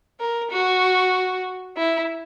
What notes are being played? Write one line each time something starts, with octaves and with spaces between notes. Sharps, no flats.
A#4
F#4
E4